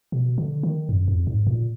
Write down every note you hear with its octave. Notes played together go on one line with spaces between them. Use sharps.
B2
D3
D#3
F#2
F2
G#2
A#2